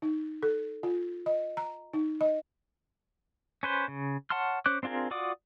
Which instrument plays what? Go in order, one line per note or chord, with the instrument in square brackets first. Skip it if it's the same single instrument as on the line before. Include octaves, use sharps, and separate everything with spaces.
[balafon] D#4
A4
F4
D#5
A#5
D#4
D#5
[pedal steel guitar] C#4 B4 C5
C#3
C#5 F#5 A5 C6 F6
C#4 C5 D6 F#6
C4 D4 F4 G#4 A#4
F4 F#4 D5 D6 D#6